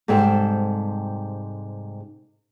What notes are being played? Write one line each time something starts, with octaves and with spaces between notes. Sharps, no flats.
G#2 C3 G3 C4 A4